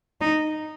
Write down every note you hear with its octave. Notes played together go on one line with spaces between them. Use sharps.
D#4